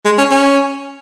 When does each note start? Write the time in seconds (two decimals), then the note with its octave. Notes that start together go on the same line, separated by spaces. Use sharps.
0.05 G#3
0.18 C#4
0.31 C#4